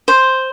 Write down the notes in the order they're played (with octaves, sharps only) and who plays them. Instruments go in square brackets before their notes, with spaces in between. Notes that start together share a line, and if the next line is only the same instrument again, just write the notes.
[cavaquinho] C5